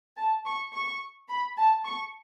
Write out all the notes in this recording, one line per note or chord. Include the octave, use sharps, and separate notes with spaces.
A5
C#6
C#6
B5
A5
C#6